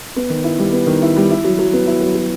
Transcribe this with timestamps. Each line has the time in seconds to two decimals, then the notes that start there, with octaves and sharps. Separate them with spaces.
0.16 B3
0.30 D#3
0.44 E4
0.59 G3
0.73 B3
0.87 D#3
1.02 E4
1.16 G3
1.31 E4
1.44 F#3
1.59 F#3
1.73 B3
1.87 E4
2.01 F#3
2.16 F#3